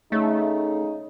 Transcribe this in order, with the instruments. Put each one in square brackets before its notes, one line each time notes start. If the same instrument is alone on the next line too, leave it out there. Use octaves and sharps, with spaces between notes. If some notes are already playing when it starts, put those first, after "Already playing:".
[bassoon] C#3 [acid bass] A3 [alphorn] D#4